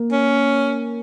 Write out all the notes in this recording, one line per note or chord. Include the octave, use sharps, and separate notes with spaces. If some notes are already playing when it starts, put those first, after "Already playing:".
Already playing: A#3
C#4